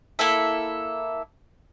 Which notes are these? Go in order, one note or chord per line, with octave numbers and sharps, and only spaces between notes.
A#3 E4 A4 E5